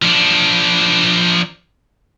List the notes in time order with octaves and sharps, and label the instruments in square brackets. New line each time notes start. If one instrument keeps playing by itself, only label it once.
[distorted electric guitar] F3 D4